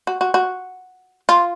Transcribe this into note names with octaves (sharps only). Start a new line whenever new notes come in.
F#4
F#4
F#4
F4